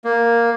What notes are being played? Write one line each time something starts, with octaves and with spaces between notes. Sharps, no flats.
A#3